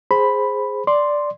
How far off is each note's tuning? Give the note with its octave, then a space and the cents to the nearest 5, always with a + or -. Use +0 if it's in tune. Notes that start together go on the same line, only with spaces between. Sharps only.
G#4 -5 C5 +0 B5 +0
D5 +0 C6 +0